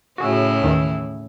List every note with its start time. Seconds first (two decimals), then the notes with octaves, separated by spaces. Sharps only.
0.18 A2 C#3 E4 F#4 G#4
0.62 D#2 D#3 E3